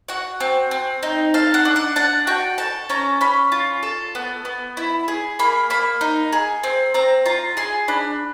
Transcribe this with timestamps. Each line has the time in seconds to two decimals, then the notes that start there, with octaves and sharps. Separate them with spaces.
0.08 F#4 F#5
0.40 C4
0.71 C4
1.03 D#4
1.34 A4 F5
1.54 F#5
1.65 D4
1.76 F#5
1.96 D4 F#5
2.27 F#4 G5
2.58 A4 A5
2.89 C#4 A#5
3.21 C#4 B5
3.52 F4
3.83 A4
4.15 B3
4.45 B3
4.77 E4
5.08 G#4
5.39 A#3 B5
5.70 A#3 B5
6.01 D#4
6.33 G#4
6.63 C4
6.94 C4 A#5
7.26 F4 A#5
7.57 G#4 C6
7.88 D4 B5